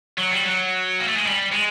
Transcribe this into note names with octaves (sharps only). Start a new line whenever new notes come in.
F#3
G3
F#3
A#3
A3
G#3
G3
G#3